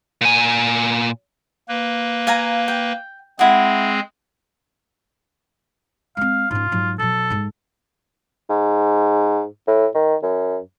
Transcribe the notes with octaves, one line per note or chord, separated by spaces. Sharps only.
A#2 G#5
A#3 B4
F5 G#5 A#5
G5
G#3 C4 E4 G#4 F#5
G#3 C4 F5
G#2 C#4 F4
G#2 F#3
B2 F#3 A4
G#2 G#3
G#2
A2
D#3
F#2